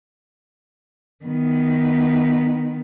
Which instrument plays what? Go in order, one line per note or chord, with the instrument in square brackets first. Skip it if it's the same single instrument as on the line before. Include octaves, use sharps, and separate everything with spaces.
[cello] D#3 B3